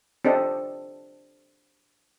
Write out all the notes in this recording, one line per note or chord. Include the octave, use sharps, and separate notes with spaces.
C4 D4 A4 D#5